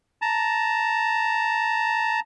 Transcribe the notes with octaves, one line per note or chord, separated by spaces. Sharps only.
A5 A#5